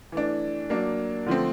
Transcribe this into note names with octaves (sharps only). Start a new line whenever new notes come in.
E3 A3 D4
F#3 A#3 D4
D3 F3 A3 C4